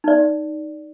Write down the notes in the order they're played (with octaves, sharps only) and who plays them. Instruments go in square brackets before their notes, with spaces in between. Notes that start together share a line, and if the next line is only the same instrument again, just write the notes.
[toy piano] D#4 D5